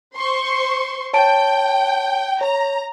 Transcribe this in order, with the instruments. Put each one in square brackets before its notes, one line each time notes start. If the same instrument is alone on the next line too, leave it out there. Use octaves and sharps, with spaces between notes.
[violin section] C5 C6 C#6
[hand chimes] C#5 A5 D7 [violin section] G5
[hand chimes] C#5 [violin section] A#5